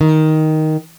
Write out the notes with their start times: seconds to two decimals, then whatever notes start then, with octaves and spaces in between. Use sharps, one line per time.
0.01 D#3